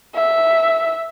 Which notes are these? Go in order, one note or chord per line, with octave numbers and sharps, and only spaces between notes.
E5